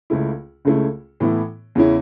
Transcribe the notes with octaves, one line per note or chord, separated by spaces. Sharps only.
C#2 C#3 A3 E4
C#2 C#3 A3 E4
A2 E3 B3 E4
E2 C#3 E3 C#4 E4